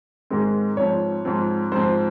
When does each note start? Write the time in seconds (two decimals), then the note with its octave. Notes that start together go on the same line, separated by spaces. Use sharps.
0.30 G#2 D#3 G#3 C4
0.77 G#2 F3 C4 C#5
1.25 G#2 F3 C4
1.72 G#2 F3 C4 C5